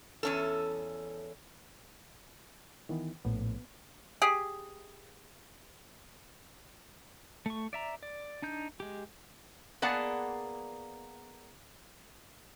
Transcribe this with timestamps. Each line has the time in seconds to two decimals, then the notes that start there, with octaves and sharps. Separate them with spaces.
0.23 E2 C#4 A4
2.89 D#3 E3 B3
3.25 A#1 A2 B3
4.22 G4 G#4
7.46 A3 C#6
7.73 D5 E5 A#5
8.03 D5
8.42 D4 D#4 G6
8.80 G#3 G4
9.82 A#3 B3 G#4 D5 F#5 A5